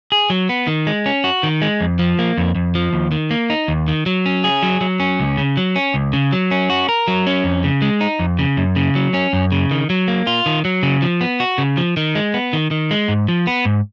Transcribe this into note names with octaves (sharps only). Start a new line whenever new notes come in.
G#4
F#3
B3
D#3
G#3
C#4
F#4
D#3
G#3
F2
F3
A#3
F2
F2
F3
D#2
D#3
A#3
D#4
D#2
D#3
F#3
C#4
G#4
F#3
F#3
C#4
C#2
C#3
F#3
C#4
C#2
C#3
F#3
C#4
F#4
A#4
F#3
C#4
F2
C#3
G#3
D#4
F2
C#3
F#2
C#3
F#3
C#4
F#2
C#3
D#3
F#3
A#3
F4
D#3
F#3
C#3
F3
B3
F#4
C#3
F3
D#3
G#3
B3
D#3
D#3
G#3
G#2
F3
B3
G#2